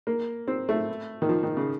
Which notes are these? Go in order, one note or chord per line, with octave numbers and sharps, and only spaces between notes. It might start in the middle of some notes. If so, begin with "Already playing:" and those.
A#3
C4
A3
D#3
F3
D#3
C#3